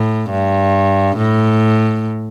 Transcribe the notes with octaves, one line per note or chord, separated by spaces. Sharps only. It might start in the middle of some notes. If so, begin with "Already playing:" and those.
Already playing: A2
G2
A2